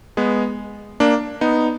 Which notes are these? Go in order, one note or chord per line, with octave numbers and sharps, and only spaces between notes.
G#3 B3
A#3 D4
B3 D#4